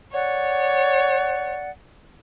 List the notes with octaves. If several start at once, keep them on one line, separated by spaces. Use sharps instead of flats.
C#5 D5 F#5